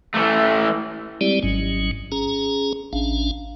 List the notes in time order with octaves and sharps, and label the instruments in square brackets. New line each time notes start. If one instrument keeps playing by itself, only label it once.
[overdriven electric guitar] E3 A3
[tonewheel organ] G3 G#3 C4 E4 G4 D5
G#1 G#2 F#3 C#4
C#4 G#4 A#5
A1 C#4 D4 F5